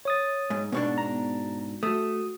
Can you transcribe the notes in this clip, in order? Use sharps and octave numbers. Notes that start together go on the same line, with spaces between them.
C#5 D#6 A6
G#2
G#2 B2 B3 D4 C#6
A#5
A3 F#4 D#6